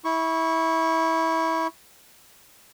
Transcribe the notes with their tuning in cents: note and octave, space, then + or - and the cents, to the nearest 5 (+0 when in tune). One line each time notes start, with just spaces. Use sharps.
E4 -20 C#6 +0